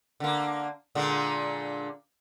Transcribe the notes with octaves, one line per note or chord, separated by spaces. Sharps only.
D3 A#3
A#2 D3 G#3